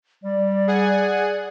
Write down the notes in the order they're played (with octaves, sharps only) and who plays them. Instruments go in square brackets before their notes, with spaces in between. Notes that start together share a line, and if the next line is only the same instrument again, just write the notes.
[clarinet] G3 [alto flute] D5
[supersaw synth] G#4 F#5 G#5